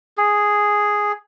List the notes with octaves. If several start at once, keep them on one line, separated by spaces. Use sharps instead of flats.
G#4